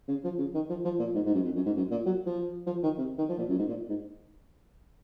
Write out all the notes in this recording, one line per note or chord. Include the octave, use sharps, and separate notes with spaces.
C#3
F3
C#3
D#3
F3
F3
A#2
G#2
G#2
F#2
F2
F#2
G#2
F#2
A#2
F#3
F3
F3
D#3
C3
D#3
F3
A#2
F#2
G#2
A#2
G#2